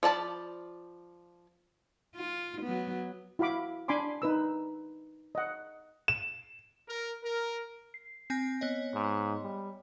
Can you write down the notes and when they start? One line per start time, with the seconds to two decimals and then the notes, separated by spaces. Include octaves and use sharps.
0.03 F3 D5 A5 B5
2.15 F4
2.62 F#3 B3
3.39 E4 F#4 F5 B5 D6
3.88 D4 G#5 B5 C6 D6
4.22 D#4 B4 E6
5.35 D#5 F#5
6.08 E7
6.88 A#4
7.23 A#4
7.94 C7
8.30 C4 G#5 A#6
8.61 B3 C#5 D#5
8.94 G#2
9.42 G3